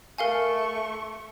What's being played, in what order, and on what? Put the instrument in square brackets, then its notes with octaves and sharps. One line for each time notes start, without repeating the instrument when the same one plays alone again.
[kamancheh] A3 C#6 [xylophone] A#4 F5 G#5